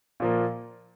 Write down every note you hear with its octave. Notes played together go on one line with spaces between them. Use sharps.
A#2 F3 A#3